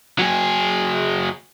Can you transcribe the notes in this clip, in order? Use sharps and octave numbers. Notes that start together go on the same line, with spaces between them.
F#3 G#4